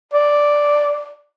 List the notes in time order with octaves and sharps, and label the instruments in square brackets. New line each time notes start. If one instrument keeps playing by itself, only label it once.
[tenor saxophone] D5